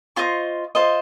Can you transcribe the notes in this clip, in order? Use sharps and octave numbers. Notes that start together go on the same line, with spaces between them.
F4 C5 D#5 C#6
F4 C5 D#5